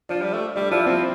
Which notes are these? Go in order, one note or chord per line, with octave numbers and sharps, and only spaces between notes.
F3 D4
G3
A3
G3 D4
F3 E4
F3 C4